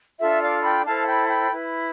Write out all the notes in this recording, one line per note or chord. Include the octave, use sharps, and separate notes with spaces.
D4 F4 A4 E5
D5 F5
G5 B5
E4 A4 C5 F5 A5
G5 B5
G5 B5
E4 B4